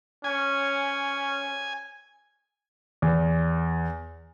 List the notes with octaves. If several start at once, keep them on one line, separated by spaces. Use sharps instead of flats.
C#4 G#5
E2